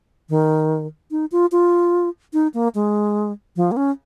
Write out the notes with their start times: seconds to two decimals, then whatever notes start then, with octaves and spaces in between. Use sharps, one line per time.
0.29 D#3
1.11 D#4
1.32 F4
1.52 F4
2.33 D#4
2.54 A#3
2.75 G#3
3.56 F3
3.71 A#3
3.77 C#4